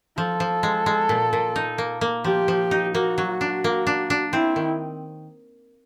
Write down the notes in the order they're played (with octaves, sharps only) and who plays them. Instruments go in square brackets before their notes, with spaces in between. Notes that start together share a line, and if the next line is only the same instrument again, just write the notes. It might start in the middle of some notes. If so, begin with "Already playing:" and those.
[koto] F3 [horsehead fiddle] A4
[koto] F3
G#3
G#3
A#2
A#2
D#4
A#3
A#3
[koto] F3 [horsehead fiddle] G4
[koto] F3
D#4
[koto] A#3 [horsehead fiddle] F#4
[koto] F#3
[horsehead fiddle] F#4
[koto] D4
A#3
D4
D4
[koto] C4 [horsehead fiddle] E4
[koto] D#3